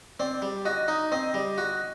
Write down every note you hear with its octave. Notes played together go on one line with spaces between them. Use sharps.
C4 D5
G3
F#4 D#5
D#4
C4 D#5
G3
F#4